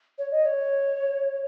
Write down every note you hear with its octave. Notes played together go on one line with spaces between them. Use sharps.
C#5
D#5
C#5